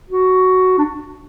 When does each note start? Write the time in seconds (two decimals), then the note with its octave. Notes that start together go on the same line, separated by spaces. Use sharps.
0.09 F#4
0.78 D4